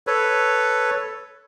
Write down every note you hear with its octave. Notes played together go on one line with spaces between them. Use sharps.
A4 B4 C#5